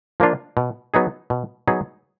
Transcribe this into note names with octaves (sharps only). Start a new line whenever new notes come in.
F3 A#3 D4 F4
B2
F#3 B3 D#4 G#4
B2
F#3 B3 D#4 G#4